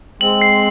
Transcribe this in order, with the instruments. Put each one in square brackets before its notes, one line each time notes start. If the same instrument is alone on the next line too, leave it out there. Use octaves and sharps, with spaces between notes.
[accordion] G#3 C4 [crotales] F#7
[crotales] C7